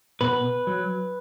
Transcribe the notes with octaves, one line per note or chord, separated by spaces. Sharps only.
B2 B4
F#3